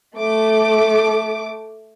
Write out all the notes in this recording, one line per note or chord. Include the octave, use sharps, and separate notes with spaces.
A3 D6